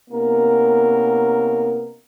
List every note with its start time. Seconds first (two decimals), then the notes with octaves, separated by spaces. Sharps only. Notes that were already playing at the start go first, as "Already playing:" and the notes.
0.11 C3 A#3 B3 C#4 D#4 A#4